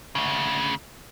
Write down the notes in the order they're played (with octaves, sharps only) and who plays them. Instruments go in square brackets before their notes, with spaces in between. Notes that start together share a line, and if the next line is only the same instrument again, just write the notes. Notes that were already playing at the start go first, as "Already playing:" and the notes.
[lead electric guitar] D2 C#3